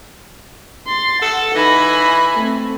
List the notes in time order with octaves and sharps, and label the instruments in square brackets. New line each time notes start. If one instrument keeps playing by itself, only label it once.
[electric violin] C6 A6
[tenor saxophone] A4 [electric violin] F#5
[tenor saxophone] E3 [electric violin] D#4 A#6 [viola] G#5 B5
[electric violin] A3 C4